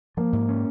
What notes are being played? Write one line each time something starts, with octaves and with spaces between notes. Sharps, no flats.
F3 A#3
G#2
C#4